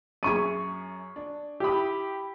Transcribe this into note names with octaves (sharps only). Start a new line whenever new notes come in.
F#2 G#4 E5 C#6 G#6 D#7
D4
E4 G4 B5 D#6